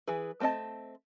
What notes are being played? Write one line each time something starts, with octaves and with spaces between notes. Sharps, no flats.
E3 G#4 B4
A3 C4 B4 D#5 A5